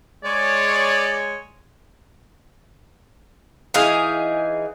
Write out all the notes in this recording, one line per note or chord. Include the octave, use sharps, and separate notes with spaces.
G#3 C#5 D5
E3 D#4 G#4 F5